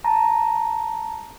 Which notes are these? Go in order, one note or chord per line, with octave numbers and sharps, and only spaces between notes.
A5 A#5 A#6